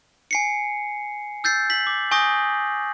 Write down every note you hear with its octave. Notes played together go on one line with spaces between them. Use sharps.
G#5 C7 C#7
E6 G6 A6 C7
B6 F#7
D6
G#5 C#6 D#6 G6 A#6